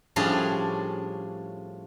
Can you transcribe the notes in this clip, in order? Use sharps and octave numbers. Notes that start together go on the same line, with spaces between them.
A2 F3 G3 C#4 D4 G#4